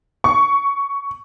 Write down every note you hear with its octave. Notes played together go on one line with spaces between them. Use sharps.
C#6